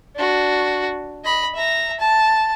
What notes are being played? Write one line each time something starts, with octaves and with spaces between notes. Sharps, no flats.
D4 F#4
D#5 B5
E5 A#5
A5